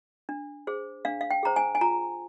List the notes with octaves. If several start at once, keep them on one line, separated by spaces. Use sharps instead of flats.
D4
G#4 C5
D4 F5
F5
G5
G#4 C5 A#5
G#5
G#5
F4 A#5